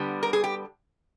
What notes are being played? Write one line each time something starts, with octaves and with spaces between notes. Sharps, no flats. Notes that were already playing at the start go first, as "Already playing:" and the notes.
Already playing: D3 G3 B3 D4
A#4
G#4
G4